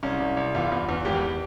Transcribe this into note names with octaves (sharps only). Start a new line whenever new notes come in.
C2 C#4
C2
C2
E2 F4
E2
E2
G#1 G4